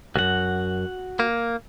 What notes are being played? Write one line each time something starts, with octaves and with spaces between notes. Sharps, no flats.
C2 F#2 F#4 F#5
A#3